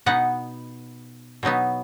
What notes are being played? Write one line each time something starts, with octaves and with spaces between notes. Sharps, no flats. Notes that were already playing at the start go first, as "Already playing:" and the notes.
B2 B3 D#4 F#5
B2 F#3 B3 D#4